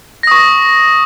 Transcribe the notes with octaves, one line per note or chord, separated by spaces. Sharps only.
C#6 D#6 A#6